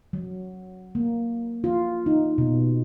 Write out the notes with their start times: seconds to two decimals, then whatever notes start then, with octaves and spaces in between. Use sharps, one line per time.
0.13 F#3
0.95 A#3
1.64 F4
2.06 D#4
2.38 B2